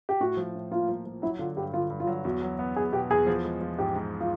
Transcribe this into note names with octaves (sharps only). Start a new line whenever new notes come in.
G4
A2 F#4
F3
A2
A#3 F4
F3
F3
F#3 E4
D3 F4
G2 G4
D3 F4
G2
F4
F#3
E2 F#4
F#3
B3
E2 G#4
B2 G4
E2 G#4
F3
G#3
F3
G#2 G4
G#2
F4